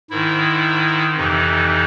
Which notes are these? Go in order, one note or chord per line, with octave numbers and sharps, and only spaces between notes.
G#2 D#3 E4
F2 C3 E3 D#4